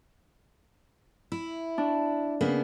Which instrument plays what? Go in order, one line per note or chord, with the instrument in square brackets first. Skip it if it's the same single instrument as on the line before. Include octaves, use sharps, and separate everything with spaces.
[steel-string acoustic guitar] E4
[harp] D4
[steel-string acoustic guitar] C#3 A#3 B3